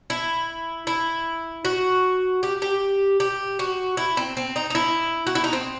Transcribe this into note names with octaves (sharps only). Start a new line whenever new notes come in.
E4
E4
F#4
G4
G4
G4
F#4
E4
C4
C4
D#4
D#4
E4
F#4
E4
D#4
C4